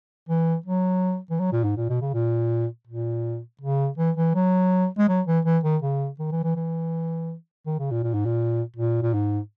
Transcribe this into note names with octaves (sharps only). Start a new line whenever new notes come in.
E3
F#3
E3
F#3
A#2
G#2
A#2
B2
C#3
A#2
A#2
C#3
E3
E3
F#3
G#3
F#3
E3
E3
D#3
C#3
D#3
E3
E3
E3
D#3
C#3
A#2
A#2
G#2
A#2
A#2
A#2
G#2